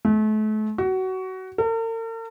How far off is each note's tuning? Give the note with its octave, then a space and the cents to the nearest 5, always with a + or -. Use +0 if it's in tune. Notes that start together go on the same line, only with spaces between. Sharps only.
A3 -35
F#4 +20
A#4 -45